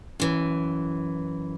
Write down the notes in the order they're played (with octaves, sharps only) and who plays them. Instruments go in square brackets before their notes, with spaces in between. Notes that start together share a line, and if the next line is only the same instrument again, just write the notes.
[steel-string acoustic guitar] F#2 E3